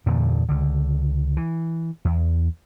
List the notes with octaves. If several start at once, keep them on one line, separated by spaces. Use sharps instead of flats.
E2 G2 A#2 D3
C#2 D3
E3
E2